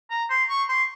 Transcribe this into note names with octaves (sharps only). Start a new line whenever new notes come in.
A#5
C6
C#6
C6